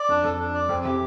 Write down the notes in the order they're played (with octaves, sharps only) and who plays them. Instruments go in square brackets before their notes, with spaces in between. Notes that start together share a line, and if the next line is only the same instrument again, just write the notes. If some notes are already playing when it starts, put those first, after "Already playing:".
Already playing: [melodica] D5
[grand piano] F2 [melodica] D4
[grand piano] F2 [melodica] A4
[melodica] D4
D5
[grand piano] F2 [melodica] C4
[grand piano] C3 E3 [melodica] G4